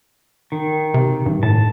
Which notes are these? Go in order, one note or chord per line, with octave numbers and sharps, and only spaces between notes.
D#3
C3
G2
A2 A5